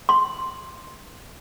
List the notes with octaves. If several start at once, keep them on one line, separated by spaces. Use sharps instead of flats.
C6